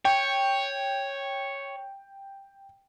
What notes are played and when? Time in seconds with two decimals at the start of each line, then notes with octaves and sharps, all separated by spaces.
0.05 C#5 G5